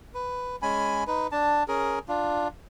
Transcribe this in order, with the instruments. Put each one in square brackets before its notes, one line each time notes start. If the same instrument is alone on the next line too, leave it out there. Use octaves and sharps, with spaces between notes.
[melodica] B4
G#3 C#4 G#5 B5
D#4 B4
D4 A5
C#4 G#4 A#4
D4 F4